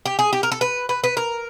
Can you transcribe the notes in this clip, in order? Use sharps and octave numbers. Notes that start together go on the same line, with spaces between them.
G4
G#4
G4
A#4
A4
B4
B4
B4
A#4